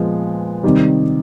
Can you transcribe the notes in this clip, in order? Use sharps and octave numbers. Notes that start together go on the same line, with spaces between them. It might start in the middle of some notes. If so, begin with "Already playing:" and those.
Already playing: A#2 F3 G#3 B3
C3 D#3 G3